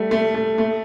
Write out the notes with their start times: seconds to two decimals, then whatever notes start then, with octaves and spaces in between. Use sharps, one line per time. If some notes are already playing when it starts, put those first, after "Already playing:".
Already playing: G3 A3
0.11 A3
0.34 A3
0.58 A3